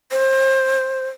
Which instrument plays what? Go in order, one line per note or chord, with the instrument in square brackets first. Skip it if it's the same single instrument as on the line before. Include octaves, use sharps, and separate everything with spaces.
[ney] C5